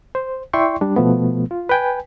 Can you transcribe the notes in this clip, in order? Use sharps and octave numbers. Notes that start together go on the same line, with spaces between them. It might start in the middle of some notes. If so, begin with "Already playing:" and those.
C5
E4 D5 E5 G5 C6 C#6
G3 D4
B2 F3 A3 B3
F4
B4 G5 G#5